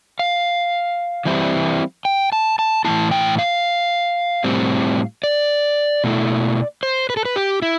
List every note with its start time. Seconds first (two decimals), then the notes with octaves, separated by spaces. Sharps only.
0.19 F5
1.25 E3 G3 C4 E4
2.05 G5
2.32 A5
2.59 A5
2.85 A2 E3 B3 E4 A5
3.11 G5
3.39 F5
4.44 A2 G3 C4
5.23 D5
6.04 B2 A3 E4
6.83 C5
7.10 B4
7.17 A4
7.25 B4
7.36 G4
7.62 E4